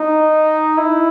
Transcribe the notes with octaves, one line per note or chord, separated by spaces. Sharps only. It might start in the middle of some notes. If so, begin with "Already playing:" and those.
Already playing: D#4
E4